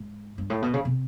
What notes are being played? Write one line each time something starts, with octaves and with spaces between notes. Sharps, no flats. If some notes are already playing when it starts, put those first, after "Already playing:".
Already playing: G#2
G2
A2
B2
C#3
C3